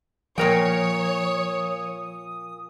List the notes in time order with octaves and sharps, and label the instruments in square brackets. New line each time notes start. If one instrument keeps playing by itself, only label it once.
[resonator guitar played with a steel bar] A#2 A#4 G5 [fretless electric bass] F3 [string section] C#5 [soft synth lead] D#6